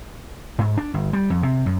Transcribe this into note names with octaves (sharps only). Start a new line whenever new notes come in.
G#2
D4
G1
G3
F2
C3
F#2